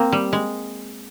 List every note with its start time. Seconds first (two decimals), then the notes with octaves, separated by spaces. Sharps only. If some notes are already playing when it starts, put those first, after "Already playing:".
Already playing: A#3 C4
0.12 G3
0.33 G#3